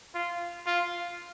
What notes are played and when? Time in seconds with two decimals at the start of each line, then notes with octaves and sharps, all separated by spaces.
0.14 F4
0.66 F4